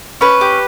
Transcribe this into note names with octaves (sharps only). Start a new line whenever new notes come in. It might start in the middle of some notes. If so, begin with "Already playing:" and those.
C#4 B4
G4